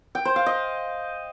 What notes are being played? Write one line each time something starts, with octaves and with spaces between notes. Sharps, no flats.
G5
C5
F5
D#5